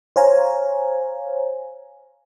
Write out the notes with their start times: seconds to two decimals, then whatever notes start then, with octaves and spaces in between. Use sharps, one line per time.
0.16 C5 C#5 F5 G#5 A#5